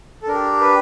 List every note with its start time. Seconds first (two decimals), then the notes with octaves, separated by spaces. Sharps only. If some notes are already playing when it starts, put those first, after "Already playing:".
0.23 A4
0.28 D4 G4 A#4
0.61 B4